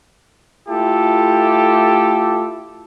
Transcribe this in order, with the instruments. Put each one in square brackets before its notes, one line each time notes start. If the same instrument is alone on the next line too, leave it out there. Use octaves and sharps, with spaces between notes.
[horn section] A3 E4 F4 G4 A4